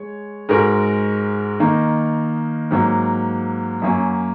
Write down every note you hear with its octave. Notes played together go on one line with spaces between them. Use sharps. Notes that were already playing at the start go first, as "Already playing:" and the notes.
Already playing: G#3 C#5
G#2 G#3 F#4 A#4
D#3 A#3 D#4
G#2 F#3 A#3
F#2 F#3 A#3 C#4